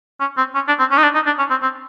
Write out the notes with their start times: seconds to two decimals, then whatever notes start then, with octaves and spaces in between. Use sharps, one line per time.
0.20 C#4
0.37 C4
0.55 C#4
0.68 D4
0.79 C4
0.91 C#4
0.98 D#4
1.03 D4
1.14 D#4
1.26 D4
1.39 C#4
1.50 C4
1.62 C4